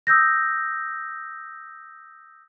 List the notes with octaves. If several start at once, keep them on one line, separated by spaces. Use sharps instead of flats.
D#6 E6 G6 A#6